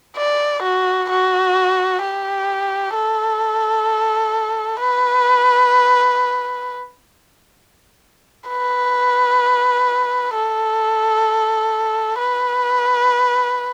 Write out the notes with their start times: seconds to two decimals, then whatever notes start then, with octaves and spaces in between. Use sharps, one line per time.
0.17 D5
0.63 F#4
1.10 F#4
2.02 G4
2.95 A4
4.80 B4
8.50 B4
10.35 A4
12.19 B4